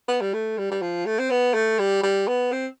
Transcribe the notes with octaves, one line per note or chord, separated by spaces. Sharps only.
B3
G3
A3
G3
G3
F3
A3
C4
B3
A3
G3
G3
B3
C4